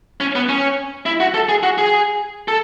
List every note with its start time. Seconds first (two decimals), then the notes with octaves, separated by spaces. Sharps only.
0.20 C#4
0.35 B3
0.49 C#4
1.06 E4
1.20 F#4
1.34 A4
1.49 G#4
1.63 F#4
1.78 G#4
2.48 A4